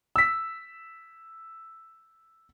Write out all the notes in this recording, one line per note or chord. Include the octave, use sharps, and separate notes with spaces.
E6 B6